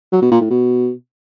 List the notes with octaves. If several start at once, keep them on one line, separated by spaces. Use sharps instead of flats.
F#3
B2
A#2
A2
B2